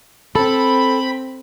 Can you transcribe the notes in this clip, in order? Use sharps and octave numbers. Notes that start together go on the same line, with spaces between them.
C4 A4 B5